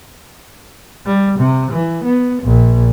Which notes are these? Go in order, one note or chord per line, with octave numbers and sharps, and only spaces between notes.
G3
C3
E3
B3
A#1